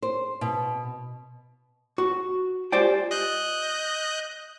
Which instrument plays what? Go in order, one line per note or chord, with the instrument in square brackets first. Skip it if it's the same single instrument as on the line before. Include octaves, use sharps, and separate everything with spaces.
[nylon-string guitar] C5
B2
[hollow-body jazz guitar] F#4
[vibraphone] G#3 F4 G4 [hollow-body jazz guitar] C5 D5 G5
[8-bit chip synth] D#5 F#6 G6